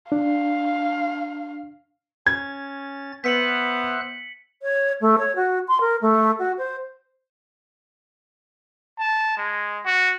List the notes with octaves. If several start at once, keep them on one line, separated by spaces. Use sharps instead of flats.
D4 F5
C#4 G#6 A6
B3 C5 E5 F#6 B6 C#7 F#7
C#5
A3
C#5
F#4
C6
A#4
A3
F#4
C5
A5
G#3
F#4